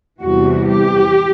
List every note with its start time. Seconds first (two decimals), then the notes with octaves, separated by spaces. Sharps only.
0.23 E2 C3 E3 G3 F#4
0.70 G4